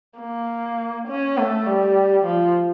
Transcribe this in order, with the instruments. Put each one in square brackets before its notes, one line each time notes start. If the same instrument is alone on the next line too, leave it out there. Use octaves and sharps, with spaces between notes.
[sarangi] A#3
C#4
A3
G3
F3